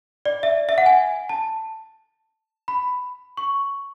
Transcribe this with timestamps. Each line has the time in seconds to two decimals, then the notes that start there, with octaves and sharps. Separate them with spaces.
0.25 D5
0.43 E5
0.69 E5
0.78 F#5
0.86 G#5
1.29 A5
2.68 B5
3.37 C#6